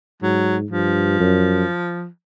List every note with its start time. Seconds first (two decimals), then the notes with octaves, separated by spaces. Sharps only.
0.22 G#2 F#3
0.71 G2 F3
1.20 F#2